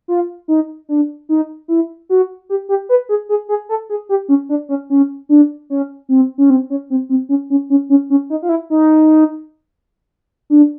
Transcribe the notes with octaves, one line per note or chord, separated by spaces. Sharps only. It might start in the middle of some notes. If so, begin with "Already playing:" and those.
F4
D#4
D4
D#4
E4
F#4
G4
G4
B4
G#4
G#4
G#4
A4
G#4
G4
C#4
D4
C#4
C#4
D4
C#4
C4
C#4
C4
C#4
C4
C4
C#4
C#4
C#4
C#4
C#4
D#4
F4
E4
D#4
D4